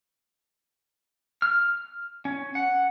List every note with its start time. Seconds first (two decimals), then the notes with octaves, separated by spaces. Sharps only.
1.42 F6
2.25 C#4
2.55 F#5